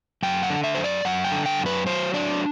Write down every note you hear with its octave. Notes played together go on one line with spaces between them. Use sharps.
F#2 G5
F#5
D3
E5
F#2 C5
D5
F#2 F#5
G5
D3
G5
F#2
B4
F#3 C5
D4 D5